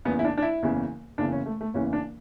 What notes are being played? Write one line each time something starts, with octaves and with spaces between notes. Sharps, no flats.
F#1 E2 C#3 E3 B3
E4
D4
D4
E4
F#1 E2 C#3 E3
F#1 E2 C#3 E3 D4
C#4
A3
A3
F#1 E2 C#3 E3 C#4
D4